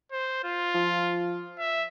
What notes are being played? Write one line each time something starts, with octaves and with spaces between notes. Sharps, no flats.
C5
F4
F3
E5